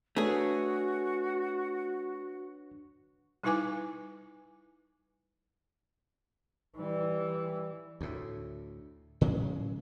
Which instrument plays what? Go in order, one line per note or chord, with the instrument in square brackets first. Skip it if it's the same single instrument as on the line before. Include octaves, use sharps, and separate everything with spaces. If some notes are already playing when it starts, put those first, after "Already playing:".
[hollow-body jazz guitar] A3 G#4 [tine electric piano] D4 B4 C#5 [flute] F#4
[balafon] G3 D#4 E4 B4 G#5 D6
[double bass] E3 G3
[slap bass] D2 A2
A2 C#3 F#3 G#3